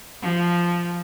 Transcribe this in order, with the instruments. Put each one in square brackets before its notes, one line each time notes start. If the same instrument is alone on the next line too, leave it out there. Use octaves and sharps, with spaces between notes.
[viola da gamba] F3